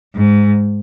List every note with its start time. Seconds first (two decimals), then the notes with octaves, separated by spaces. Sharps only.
0.15 G#2